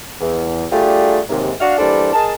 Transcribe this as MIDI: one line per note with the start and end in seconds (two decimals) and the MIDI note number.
0.20 0.66 40
0.72 1.19 55
0.72 1.19 57
0.72 1.19 62
0.72 1.19 65
0.72 1.19 67
0.72 1.19 68
1.29 1.52 39
1.29 1.52 44
1.29 1.52 48
1.61 1.76 62
1.61 1.76 66
1.61 1.76 77
1.79 2.12 52
1.79 2.12 55
1.79 2.12 58
1.79 2.12 62
1.79 2.12 69
1.79 2.12 72
2.13 2.33 68
2.13 2.33 70
2.13 2.33 75
2.13 2.33 81